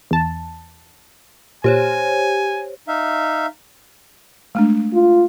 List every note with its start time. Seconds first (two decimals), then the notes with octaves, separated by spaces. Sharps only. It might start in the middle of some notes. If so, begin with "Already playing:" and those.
0.11 E2 A5
1.64 A#2 G4 C5 C#5 G#5
2.88 D#4 E5 F5
4.55 G#3 A3 D4
4.93 F4